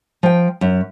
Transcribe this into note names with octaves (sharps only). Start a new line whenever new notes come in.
F3 G5
F#2